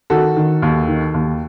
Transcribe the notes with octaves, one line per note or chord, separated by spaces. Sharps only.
D#3 F#4 A4
D#3
D#2
D#3
D#2